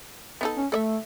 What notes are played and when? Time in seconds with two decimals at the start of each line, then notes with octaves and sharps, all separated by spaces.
0.41 B3 D#4 A4
0.57 C#4
0.72 A3 A4 D5 E5